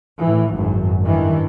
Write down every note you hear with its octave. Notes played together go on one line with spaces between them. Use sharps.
A2 E3
G#1 F#2
G2 D#3 E3